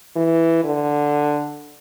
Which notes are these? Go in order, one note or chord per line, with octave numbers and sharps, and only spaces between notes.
E3
D3